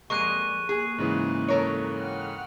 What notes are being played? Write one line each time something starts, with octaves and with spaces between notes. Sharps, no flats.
F2 G3 G#3 A#3 C#6 F#6 D#7
A#3 G#4
G#2 C#3 E3
A4 A#4 C#5
F#5 G5 F6